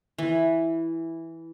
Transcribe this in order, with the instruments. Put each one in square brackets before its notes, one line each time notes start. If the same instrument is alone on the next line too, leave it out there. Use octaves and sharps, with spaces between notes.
[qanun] E3